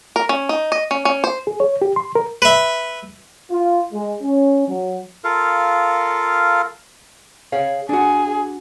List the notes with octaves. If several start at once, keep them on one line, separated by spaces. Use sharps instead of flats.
A#4
C#4
D#4
D#5
C#4
C#4
C5
G#4
C#5
G4
C6
A#4
B4 E5
F4
G#3
C#4
F#3
F4 A4 A#4 F5
G#4 C#5 F5
D4 F#4 G#4